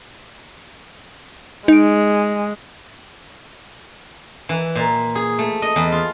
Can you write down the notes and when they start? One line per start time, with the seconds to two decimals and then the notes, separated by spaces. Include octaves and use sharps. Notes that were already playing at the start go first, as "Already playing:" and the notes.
1.68 G#3 D#4 D7
4.49 E3
4.75 A#2
5.15 G#4
5.39 A3
5.62 D#5
5.76 E2
5.92 F4